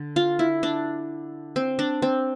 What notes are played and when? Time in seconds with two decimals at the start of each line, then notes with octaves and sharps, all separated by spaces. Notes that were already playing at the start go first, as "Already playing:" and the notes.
Already playing: D3
0.16 F4
0.39 E4
0.63 D4
1.56 C4
1.79 D4
2.02 C4